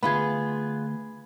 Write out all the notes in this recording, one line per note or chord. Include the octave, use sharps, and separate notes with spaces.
D2 G#2 B3 F4 G#4 B5 G#6